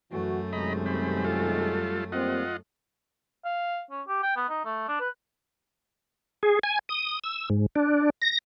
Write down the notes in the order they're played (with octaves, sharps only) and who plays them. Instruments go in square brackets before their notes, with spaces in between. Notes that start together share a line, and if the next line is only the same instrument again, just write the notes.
[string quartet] F#2 A3 [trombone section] E3 F#4
[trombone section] C3 D#3 G#3 [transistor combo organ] D#5 A#5 B5
[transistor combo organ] G3 C4 B5
G3 F4 A4
[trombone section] G3 A#3 C4 [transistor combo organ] F4 D#5 F#5
[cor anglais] F5
C#4
G4
G5
B3
D#4
A3
D4
B4
[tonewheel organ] G#4
G#5
D#6
E6
G#2
D4
A#6